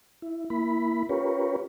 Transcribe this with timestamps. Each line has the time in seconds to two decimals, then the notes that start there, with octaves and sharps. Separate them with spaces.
0.22 E4
0.50 A#3 E4 B5
1.09 C#4 F4 G4 A#4 B4 C#5